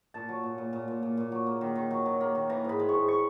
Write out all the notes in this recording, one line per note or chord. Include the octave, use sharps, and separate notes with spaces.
A#2 A5
F#3
A#2
A#2
A#2
A#2
A#2
A#2
F#3
A#3
D#3
D#3
F#3
F#3
A#3
D#3
E3 A#5
G#2 B5
G#3
C#6
G#2
C#6